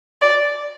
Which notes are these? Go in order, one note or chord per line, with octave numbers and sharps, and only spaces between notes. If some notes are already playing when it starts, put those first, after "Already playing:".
D5